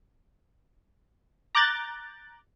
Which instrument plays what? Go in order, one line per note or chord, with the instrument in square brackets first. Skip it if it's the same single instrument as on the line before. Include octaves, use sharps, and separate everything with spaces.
[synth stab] A#5 D6 F#6 G6 A6